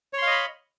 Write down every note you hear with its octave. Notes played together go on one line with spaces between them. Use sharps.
C#5 D#5 F5 B5 C6